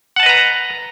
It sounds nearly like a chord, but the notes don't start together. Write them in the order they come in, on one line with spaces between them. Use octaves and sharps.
F#5 A5 D#5 B4 A#5